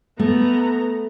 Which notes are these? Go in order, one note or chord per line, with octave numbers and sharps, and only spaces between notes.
A3 B3 A#5